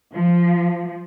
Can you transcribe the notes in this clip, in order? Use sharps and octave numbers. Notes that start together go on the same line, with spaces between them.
F3